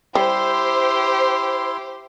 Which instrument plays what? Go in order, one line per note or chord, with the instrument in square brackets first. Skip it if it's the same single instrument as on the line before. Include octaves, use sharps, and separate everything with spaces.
[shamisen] G3 [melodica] E4 C6 [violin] G4 [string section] C5